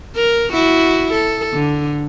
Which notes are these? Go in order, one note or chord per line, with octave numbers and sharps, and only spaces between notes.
A#4
E4 F#4
A4
D3